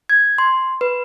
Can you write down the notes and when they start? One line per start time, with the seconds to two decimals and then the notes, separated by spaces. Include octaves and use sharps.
0.10 G#6
0.38 C6
0.81 B4